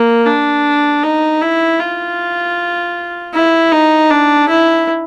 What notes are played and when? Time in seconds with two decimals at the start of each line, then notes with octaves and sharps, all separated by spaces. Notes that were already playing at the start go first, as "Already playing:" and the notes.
Already playing: A#3
0.26 D4
1.03 D#4
1.42 E4
1.80 F4
3.34 E4
3.72 D#4
4.10 D4
4.49 E4